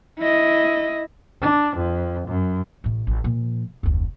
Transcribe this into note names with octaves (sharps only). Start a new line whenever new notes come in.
E4 D#5
D4
F2
F#2
A1 A2
A1
A#2 F3
F1 D2